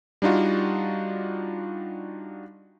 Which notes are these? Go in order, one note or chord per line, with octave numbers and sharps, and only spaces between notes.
G3 D4 D#4 F4 F#4